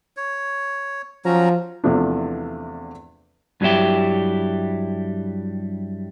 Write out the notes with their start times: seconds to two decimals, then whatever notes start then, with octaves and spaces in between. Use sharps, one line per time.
0.17 C#5
1.25 F3 F#3 C#4 A#5
1.84 E2 C3 E3 F3 A3 D4
3.61 G2 F#3 G3 C#4 E4 G4